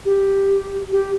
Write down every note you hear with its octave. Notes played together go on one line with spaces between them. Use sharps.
G4
G4